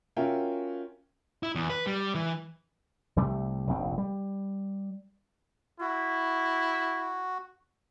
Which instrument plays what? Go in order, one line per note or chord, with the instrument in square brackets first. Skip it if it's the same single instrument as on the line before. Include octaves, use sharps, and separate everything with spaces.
[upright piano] C#4 F4 F#4 A#4 E5 G5
[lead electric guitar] E4
E2
B4
G3
E3
[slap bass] C2 C3 G3 A3
F1 A#1 C4
G3
[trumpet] E4 [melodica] F#4